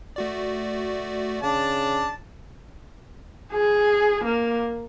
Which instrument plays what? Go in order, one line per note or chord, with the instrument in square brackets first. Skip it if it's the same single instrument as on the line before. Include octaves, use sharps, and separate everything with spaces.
[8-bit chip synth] A3 F#4 D5
[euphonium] C#3 [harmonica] D4 A5
[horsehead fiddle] G#4
A#3